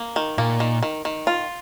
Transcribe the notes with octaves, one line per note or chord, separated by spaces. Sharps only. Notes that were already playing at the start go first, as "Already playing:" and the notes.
Already playing: A#3
D#3
A#2 A#3
D#3
D#3
D#3
F4